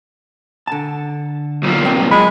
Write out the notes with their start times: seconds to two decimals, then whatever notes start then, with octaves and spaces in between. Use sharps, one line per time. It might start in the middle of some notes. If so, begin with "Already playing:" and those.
0.67 D3 A5
1.64 B1 A#2
1.84 G2 C4 G5
2.11 G#3 B5